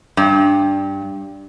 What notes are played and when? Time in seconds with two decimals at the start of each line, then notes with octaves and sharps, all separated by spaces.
0.17 G2